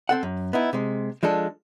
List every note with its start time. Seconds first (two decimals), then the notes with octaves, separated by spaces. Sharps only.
0.09 C4 A4 F#5
0.23 F#2
0.53 B3 D#4 E4
0.73 C3 G#3
1.23 F3 G#3 D4 A4